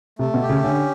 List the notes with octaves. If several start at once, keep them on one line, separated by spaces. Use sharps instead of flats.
C3 A3
B2
G4
C#3
D3 C#4